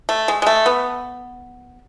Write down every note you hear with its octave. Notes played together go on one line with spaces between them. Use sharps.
A3
G#3
G#3
A3
B3